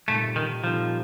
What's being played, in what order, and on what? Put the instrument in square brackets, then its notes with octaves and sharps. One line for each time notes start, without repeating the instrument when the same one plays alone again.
[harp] A#2 G3 C4 D#4 A4 [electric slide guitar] A3
[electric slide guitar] D#3
[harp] A#2 G3 C4 D#4 A4 [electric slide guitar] F3